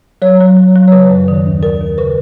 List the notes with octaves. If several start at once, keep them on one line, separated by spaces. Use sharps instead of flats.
F#3 C#5
F#3
F#3
F#3
C#5
C#3 B4
F#2
D#3
D#2
D#3 A#4
D#2
C#3 B4